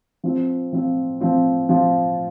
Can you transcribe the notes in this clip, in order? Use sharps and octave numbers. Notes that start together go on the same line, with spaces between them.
F3 C4 F4
F3 C4 F4
F3 C4 F4
F3 C4 F4